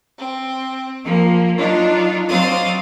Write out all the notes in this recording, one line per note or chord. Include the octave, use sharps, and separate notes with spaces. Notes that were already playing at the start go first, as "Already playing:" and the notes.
C4
F3 A#3
F#3 D4 D#4 F4
F#3 C4 C5 D5 F5 D#6